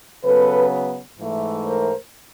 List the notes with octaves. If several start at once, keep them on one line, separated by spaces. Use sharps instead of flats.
C#3 F#3 B3 A4 B4
G#2 E3 A3
A#4 C5